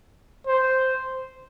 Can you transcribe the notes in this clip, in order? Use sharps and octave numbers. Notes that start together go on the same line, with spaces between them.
C5